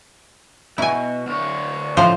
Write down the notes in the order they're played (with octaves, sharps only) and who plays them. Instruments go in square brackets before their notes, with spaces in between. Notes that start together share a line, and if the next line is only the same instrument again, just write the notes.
[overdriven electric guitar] B2 [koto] E4 G#5
[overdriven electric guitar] D2 C#5
[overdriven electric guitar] D2 F4 [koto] A2 F3 C5